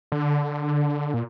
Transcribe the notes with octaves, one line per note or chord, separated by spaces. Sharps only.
D3
A#2